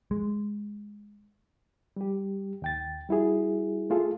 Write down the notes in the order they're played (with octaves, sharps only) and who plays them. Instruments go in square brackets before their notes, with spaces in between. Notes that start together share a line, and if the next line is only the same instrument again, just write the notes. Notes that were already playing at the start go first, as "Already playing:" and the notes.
[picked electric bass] G#3
[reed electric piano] G3 G4
D#2 G5 A6
G3 E4 F#4 G#4
A3 F4 G#4 A4